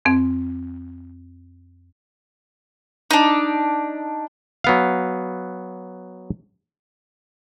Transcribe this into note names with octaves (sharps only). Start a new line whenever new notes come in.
F2 C4
D4 D#4
F#3 B3 F5